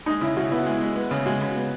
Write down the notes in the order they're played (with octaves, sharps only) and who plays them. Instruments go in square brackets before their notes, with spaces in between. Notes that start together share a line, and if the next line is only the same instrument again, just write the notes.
[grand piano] G#3 [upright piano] D#4
[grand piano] C#3 [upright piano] E4
[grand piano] C#3 [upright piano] F#4
[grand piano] B3 [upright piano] E4
[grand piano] G#3
G#3
B3
C#3
[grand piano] G#3 [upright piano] F#4
[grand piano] C#3
B3